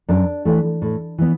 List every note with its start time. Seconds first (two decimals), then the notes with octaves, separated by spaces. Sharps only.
0.09 F#2 D4
0.45 E3 A3
0.82 A2
1.18 E3 B3